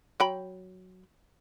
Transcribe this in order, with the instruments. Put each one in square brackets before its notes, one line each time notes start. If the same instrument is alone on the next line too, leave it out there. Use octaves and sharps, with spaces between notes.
[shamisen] F#3 G5 B5